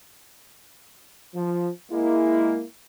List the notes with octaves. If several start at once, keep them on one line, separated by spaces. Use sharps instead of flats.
F3
G#3 A#3 E4